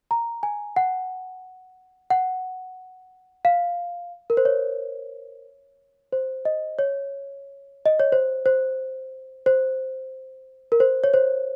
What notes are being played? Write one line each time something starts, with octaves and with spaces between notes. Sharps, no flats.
A#5
G#5
F#5
F#5
F5
A#4
C5
C#5
C5
D#5
C#5
D#5
C#5
C5
C5
C5
A#4
C5
C#5
C5